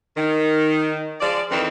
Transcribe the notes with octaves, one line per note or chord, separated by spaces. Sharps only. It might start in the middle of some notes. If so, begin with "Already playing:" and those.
D#3
F3 G#3 D5
F2 D#3 E3 C4